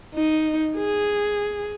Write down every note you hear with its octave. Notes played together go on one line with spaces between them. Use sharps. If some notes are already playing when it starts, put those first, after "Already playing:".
D#4
G#4